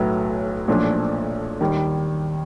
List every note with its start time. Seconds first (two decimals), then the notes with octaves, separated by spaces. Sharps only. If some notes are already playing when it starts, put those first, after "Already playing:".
Already playing: B1 A2 F#3 B3
0.68 B1 A#2 F3 A3 D4
1.61 D#2 D#3 G3